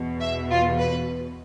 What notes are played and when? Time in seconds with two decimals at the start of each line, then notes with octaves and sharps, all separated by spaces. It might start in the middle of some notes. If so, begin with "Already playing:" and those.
Already playing: E2 B2
0.20 E5
0.50 F4
0.78 B4